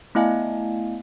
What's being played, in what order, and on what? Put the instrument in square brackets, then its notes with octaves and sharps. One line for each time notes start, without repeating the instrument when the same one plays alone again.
[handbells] A3 B3 E4 D#5 F5 G#5